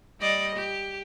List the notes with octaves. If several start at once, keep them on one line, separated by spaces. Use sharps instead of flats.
G3 D5 D#5
G4